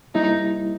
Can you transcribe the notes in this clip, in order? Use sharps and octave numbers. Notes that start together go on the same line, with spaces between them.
G3 A#3 D#4 E4